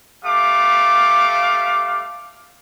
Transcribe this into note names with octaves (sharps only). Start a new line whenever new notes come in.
G3 A3 F5 D6